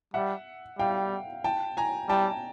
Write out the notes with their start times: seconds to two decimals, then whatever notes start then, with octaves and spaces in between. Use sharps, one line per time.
0.14 G3 E5 F#5
0.79 G3 F5 G5
1.44 G5 A5
1.77 G#5 A#5
2.09 G3 G5 A5